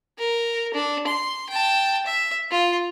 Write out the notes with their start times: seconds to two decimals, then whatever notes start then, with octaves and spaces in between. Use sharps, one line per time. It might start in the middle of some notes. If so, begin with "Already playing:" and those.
0.18 A#4
0.73 D4
1.07 C6
1.49 G5 A5
2.06 E5
2.50 F4